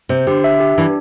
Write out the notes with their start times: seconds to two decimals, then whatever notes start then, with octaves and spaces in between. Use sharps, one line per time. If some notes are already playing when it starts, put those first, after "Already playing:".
0.09 C3 C5
0.27 D3 G4
0.44 E5
0.60 G4
0.78 E3 D4